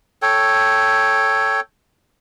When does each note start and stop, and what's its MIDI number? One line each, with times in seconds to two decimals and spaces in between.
0.22 1.60 69
0.22 1.60 73
0.22 1.60 79